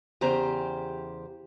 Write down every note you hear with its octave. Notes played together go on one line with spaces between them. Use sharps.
E2 C#3 G4 C5 A#5